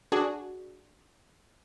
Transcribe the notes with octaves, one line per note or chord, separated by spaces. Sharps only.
D4 F#4 G#4